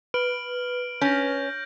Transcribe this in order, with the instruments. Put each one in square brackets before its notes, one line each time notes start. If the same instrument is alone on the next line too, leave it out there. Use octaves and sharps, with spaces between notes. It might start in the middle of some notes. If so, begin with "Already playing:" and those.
[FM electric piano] B4 [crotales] F6 D7 F#7
[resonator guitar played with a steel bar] C#4 [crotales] G6 A#6